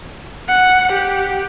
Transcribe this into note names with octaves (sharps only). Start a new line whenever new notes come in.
F#5
G4